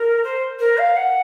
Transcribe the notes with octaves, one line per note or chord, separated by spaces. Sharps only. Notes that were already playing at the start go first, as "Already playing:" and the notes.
Already playing: A#4
C5
A#4
F5
F#5